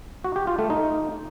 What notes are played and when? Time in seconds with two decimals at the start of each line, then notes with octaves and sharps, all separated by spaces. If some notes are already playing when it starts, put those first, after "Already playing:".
0.24 F#4
0.36 G4
0.47 F4
0.59 A3
0.70 D#4